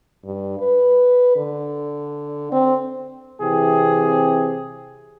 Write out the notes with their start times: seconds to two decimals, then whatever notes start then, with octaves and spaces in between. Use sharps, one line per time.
0.25 G2
0.60 B4
1.36 D3
2.52 C4
3.40 C3 E3 C4 G4 G#4